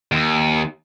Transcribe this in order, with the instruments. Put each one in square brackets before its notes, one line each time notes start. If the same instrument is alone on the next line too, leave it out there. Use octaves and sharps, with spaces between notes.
[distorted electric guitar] D#2